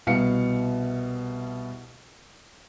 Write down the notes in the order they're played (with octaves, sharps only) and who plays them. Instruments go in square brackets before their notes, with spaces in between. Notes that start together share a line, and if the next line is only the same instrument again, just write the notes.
[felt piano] C2 B2 F5 C#7